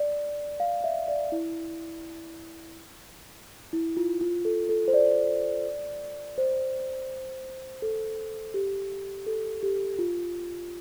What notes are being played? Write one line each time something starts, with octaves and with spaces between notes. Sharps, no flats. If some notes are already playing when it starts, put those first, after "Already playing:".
Already playing: D5
F5
E5
D5
E4
E4
F4
F4
A4
A4
C5
D5
C5
A4
G4
A4
G4
F4